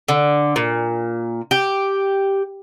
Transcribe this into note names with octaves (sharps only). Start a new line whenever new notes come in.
D3
A#2
G4